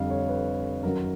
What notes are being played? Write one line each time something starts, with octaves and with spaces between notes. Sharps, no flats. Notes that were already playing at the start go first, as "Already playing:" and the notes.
Already playing: F2 D3 G3 F5
C#5
B4
F#2 D#3 F#3 A#4